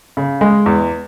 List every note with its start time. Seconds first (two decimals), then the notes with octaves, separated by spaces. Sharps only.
0.17 C#3
0.41 G#3
0.66 E2